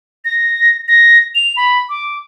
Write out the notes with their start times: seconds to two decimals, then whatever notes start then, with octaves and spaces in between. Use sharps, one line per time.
0.25 A#6
0.88 A#6
1.35 F7
1.57 B5
1.89 D6